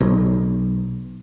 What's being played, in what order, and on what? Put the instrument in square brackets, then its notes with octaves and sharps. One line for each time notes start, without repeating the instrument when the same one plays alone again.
[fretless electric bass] B1